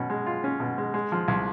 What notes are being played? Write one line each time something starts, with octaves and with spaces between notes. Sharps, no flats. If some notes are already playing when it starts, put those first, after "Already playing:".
Already playing: B2 C#4
G#3
F4
C#4
B2
G#3
G#3
F3
C2